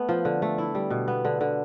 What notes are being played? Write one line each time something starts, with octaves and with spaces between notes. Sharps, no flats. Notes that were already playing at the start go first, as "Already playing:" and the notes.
Already playing: A3 B3
F3
D3
A3
E4
G3
B2
B3
D3
D3